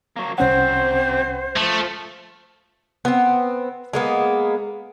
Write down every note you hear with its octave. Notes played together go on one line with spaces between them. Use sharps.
F#3 A#3
C2 F#3 C4 C#4 C5 F#5
F3 A3
B3 C4
G#3 A#3 B3